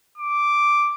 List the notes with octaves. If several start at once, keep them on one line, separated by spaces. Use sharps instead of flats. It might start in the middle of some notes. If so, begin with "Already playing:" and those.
D6